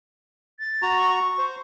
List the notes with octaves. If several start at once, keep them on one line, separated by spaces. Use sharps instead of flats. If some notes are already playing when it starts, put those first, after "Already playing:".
A6
F#4 A#5
C#6
C#6
C5